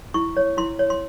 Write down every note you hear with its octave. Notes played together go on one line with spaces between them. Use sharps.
E4 C#6
C#5
E4 C6
C#5
C6